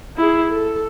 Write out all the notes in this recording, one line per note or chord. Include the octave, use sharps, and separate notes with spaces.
E4 G#4
A4